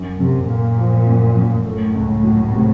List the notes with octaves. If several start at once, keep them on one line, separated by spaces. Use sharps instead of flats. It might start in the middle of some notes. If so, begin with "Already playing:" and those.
Already playing: F#2
F#2 C3
A#2 A#3
F3
F#2
F#2
A2 A3
C#2
F#3
C3